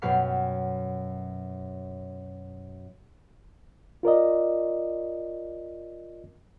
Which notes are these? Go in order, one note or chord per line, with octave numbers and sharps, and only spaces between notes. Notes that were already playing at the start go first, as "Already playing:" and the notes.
F#2 B2 B4 G5 F6 C7
F4 A#4 D5 D#5